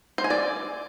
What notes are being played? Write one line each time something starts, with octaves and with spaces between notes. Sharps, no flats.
C5
G#5
D5